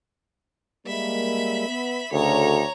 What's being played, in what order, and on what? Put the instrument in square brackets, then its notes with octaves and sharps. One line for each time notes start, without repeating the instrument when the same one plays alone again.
[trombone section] G3 G#3 A#3 [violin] E5 B5
[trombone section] B3
[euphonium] D2 [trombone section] C#3 F#4 A4 [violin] C#5 A#5